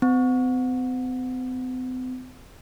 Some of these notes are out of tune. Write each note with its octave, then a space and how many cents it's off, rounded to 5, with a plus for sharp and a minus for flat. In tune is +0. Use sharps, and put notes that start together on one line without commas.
C4 -45